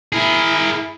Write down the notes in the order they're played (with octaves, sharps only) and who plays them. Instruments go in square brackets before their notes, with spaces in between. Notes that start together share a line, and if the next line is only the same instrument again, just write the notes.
[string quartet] E4 [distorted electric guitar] G#4 A#4